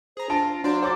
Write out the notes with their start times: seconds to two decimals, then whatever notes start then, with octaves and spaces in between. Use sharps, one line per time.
0.17 G#4 C5 A#5
0.30 D4 F4 A5 A#6 D7
0.64 F#3 D4 F4 F#4 C5 D5
0.82 A4 C5 C#5 D6 A6